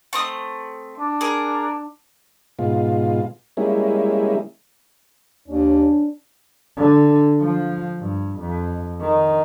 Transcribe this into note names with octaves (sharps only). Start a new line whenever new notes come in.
A3 C4 D#6
D4
G#4 A#4
G#2 B2 F4
G3 G#3 A#3 C#4 E4
D#2 C#4 D4
D3
F3
G2
F2
D#3